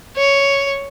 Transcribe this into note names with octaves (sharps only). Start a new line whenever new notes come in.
C#5